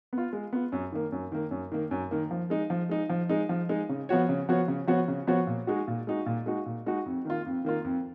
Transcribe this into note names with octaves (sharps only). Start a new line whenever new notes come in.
B3
F4
G#3
B3 F4
F#2
D#3 A#3
F#2
D#3 A#3
F#2
D#3 A#3
F#2
D#3 A#3
F3
G#3 D#4
F3
G#3 D#4
F3
G#3 D#4
F3
G#3 D#4
C#3
F3 B3 F#4 C#5
C#3
F3 B3 F#4 C#5
C#3
F3 B3 F#4 C#5
C#3
F3 B3 F#4 C#5
A#2
G#3 D#4 F#4
A#2
G#3 D#4 F#4
A#2
G#3 D#4 F#4
A#2
G#3 D#4 F#4
F2
D#3 A#3 F4
F2
D#3 A#3 F4
F2